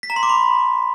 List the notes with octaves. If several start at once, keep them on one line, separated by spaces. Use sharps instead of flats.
B6
A#5
C6
D6
B5